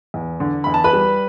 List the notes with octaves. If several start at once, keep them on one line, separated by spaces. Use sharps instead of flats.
E2
D3
E2 B5
A5
B4 B5
G3